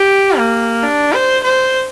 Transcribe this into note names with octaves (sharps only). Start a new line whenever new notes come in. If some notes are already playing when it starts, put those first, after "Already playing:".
Already playing: G4
A#3
D4
C5
C5